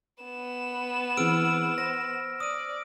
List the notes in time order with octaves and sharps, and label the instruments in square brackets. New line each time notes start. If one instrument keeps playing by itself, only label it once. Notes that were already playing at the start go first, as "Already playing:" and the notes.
[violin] B3 E7
[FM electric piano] E3 C4 G#4 [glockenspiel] E6 F6 D7
[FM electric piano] C5 [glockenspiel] A#6
[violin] D5 [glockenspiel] D#6 D#7